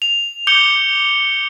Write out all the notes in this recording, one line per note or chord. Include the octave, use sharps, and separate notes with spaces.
F7
D6 G6 C#7 F7 G7